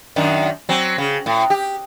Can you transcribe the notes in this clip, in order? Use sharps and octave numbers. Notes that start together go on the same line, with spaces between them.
F#2 D#3 D4
F#3 C4
C#3
A2
G4